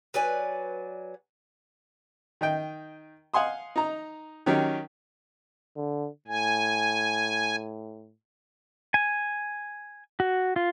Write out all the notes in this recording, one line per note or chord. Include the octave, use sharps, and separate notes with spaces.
F#3 B4 D5 G#5
D#3 D#5 G5
F5 F#5 G#5 C6 D#6
D#4 A#5
D#3 F#3 C#4 D#4 G4
D3
A2 G#5
G#5
F#4
F4